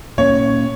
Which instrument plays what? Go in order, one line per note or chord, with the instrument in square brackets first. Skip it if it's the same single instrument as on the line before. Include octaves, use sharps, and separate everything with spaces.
[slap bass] A#2 A#3 C#4 [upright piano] C#5